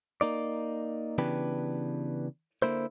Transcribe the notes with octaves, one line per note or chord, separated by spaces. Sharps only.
A#3 D#4 D5
C#3 E3 B3 D4 G4 B4
D3 A#3 E4 C5